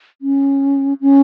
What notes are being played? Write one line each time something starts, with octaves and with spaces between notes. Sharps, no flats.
C#4
C#4